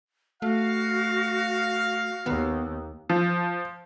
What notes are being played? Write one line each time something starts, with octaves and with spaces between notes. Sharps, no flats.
A3 F#4 F5
D#2 B3
F3